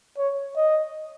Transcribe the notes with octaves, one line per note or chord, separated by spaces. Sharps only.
C#5
D#5